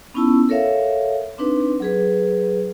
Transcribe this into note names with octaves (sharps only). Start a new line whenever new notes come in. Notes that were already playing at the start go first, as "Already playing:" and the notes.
B3 C#4 D#4 E4 A5 E6
A4 A#4 C#5 E5 F5
C4 D4 D#4 B4
F#3 G#4 B4